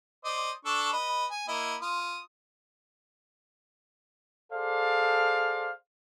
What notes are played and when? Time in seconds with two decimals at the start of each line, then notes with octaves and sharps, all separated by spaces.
0.25 C5 D5 D#5
0.65 D4 A4 C#6
0.93 B4 D#5
1.31 G#5
1.48 A#3 E4 D#5
1.81 F4 D#6
4.53 G#4 A4 C5 D5 F5